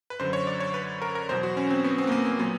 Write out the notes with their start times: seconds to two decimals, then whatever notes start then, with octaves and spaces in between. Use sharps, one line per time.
0.10 B4
0.19 F#2 D3 F#3 C5
0.33 C#5
0.47 D5
0.60 C#5
0.74 B4
1.02 A#4
1.15 A#4
1.29 E2 B2 F#3 C5
1.43 F#4
1.57 C#4
1.70 C4
1.84 B3
1.98 C4
2.07 A#3
2.12 B3
2.25 A#3
2.39 A#2 F#3 B3